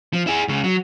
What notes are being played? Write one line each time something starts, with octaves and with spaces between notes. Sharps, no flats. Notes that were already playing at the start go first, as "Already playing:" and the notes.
F3
E4 G#4
C#2 C#3
F#3